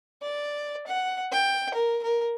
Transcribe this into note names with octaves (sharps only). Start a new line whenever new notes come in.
D5
F#5
G5
A#4
A#4